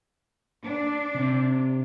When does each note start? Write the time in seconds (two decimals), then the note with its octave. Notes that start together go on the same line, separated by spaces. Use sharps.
0.63 D4
1.15 C3